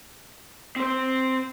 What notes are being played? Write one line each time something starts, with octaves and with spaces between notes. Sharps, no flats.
C4 C5